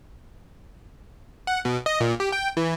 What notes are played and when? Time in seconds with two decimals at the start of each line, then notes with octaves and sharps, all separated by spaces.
1.47 F#5
1.65 B2
1.86 D#5
2.00 A#2
2.20 G4
2.32 G5
2.57 E3